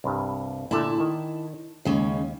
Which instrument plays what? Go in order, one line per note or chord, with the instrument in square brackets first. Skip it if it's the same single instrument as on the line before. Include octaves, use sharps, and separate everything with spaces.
[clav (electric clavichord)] C2 G2
[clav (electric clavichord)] A#2 D3 A3 [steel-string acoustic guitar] E4 A5
[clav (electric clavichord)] D#3
[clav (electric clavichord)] D#2 [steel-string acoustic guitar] C#3 G#3 C#4